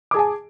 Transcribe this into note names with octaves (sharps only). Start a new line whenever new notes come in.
G#4 G#5 A5 D6